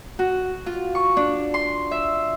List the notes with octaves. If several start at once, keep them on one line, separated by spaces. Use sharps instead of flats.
F#4
F4
C#6
D4
C6
E5